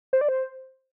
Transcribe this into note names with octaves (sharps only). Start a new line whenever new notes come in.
C5
D5
C5